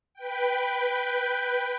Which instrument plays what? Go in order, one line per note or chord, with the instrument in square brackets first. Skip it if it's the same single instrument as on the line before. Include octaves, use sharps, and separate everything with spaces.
[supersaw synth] B4 G5